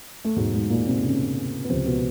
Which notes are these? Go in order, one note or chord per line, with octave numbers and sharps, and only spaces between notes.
A3
E2 G#2 B2 F#3 G#3
G#2 G#3
A#2 A#3
C3 C4
C#3 C#4
B3
C#2 C3 F3 C4
B2 B3